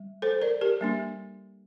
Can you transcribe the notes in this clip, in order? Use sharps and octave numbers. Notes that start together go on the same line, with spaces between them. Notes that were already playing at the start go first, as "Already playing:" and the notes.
Already playing: G3
A4 C5
A#4 D5
G4 A#4
G3 A#3 D4